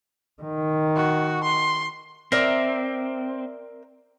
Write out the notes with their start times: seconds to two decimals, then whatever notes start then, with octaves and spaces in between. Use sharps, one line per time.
0.42 D#3
0.96 F#4
1.44 C6
2.32 C4 A#4 D5 E5